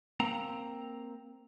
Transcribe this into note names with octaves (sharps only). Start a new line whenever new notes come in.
A#3 C4 A#5